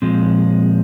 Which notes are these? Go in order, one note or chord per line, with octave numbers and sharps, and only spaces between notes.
A#2 F3 G#3 C4